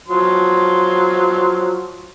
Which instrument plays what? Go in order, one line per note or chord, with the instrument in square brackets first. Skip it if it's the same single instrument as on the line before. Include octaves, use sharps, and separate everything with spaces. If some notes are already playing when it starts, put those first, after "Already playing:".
[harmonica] F3 F#3 C6